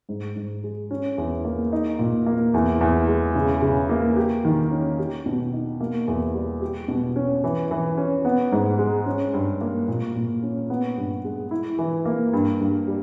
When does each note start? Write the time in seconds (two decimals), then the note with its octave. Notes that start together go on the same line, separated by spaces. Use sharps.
0.09 G#2
0.36 G#2
0.64 G#3
0.91 C#4
1.18 E2
1.45 A#3
1.72 D#4
1.99 A#2
2.26 A#3
2.54 E2
2.81 E2
3.08 G#3
3.35 C#3
3.62 C#3
3.89 A#3
4.17 G4
4.45 D#3
4.71 C#4
4.99 G4
5.26 B2
5.53 D#4
5.81 A#3
6.08 E2
6.34 G3
6.62 G4
6.88 B2
7.16 C#4
7.44 E3
7.71 E3
7.97 C#4
8.25 B3
8.52 G#2
8.79 G#3
9.06 C#4
9.34 G2
9.61 A#3
9.88 A#2
10.15 A#2
10.43 C#4
10.70 B3
10.97 G2
11.25 G#3
11.51 E4
11.79 E3
12.05 A#3
12.33 G2
12.60 G2
12.87 G3